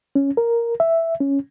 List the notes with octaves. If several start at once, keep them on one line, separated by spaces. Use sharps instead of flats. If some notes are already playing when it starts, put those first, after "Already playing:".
C#4
A#4
E5
C#4